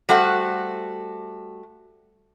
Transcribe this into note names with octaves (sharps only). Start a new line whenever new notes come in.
G3 A3 F#4 C5 F#5